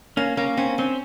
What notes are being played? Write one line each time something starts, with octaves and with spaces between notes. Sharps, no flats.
A#3 C#4
A#3 C#4
C4 C#4
C4 C#4